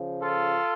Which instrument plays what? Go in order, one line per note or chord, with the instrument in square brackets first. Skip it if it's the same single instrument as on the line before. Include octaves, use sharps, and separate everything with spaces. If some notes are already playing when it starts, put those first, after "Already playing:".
Already playing: [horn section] C#3 F3
F4 A4